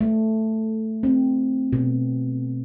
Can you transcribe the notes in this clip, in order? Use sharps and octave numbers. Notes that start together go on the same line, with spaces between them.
A3
C4
B2